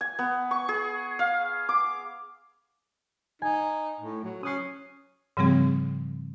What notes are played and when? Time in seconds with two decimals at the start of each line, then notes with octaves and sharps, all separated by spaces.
0.01 G#5
0.19 B3
0.51 C#6
0.69 G#4
1.19 F5
1.69 D6
3.42 D#4 G#5
4.00 A2
4.24 F#3
4.43 C#4 D#6 F#6 C7
5.37 G#2 C#3 F3 G3 C4 G#4